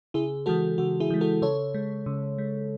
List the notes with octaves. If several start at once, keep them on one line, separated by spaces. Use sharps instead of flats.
C#3 E4 G#4
E3 G#3 F#4 A4
C#3 F#4
E4 G#4
E3 G#3
F#4 A4
C#3 A4 C#5
G#3
C#3
G#3